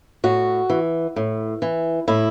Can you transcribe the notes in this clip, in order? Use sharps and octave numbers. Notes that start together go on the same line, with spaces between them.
A2 F#4
E3
A2
E3
A2 E4